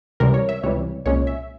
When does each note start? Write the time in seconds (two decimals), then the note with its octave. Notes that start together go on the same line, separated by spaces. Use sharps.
0.20 C#2 C3 E3 G3 A#4
0.34 C#5
0.49 E5
0.63 C#2 C3 E3 G3 C#5
1.06 C2 A#2 G#3 C#4 C#5
1.27 E5